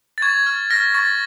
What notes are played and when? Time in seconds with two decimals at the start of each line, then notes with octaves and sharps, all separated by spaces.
0.18 A6
0.22 C#6 G#6
0.46 F6
0.70 F6 A#6
0.94 C#6 A6